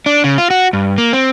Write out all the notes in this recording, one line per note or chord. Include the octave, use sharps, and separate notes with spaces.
D4
C#3
F4
F#4
G2
A#3
C4